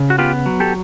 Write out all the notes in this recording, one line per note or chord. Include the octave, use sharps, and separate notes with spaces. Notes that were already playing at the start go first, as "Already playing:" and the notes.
Already playing: C#3
F#4
B3 F4 G4
F#3
G4 A4